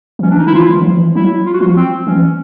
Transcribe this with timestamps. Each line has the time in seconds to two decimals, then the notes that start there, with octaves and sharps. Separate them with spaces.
0.19 D#3
0.22 E3 C#4
0.30 D4
0.38 D#4
0.46 D#3 E4
0.54 F4
0.69 D#3
0.81 F3
0.93 E3
1.15 F#3 E4
1.46 F4
1.53 F#4
1.60 F3 F4
1.76 C4
2.07 E3 C#4